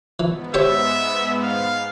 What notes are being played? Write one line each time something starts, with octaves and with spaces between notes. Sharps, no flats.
G#2 E3 B3
G4 C5 C#5 E5
F5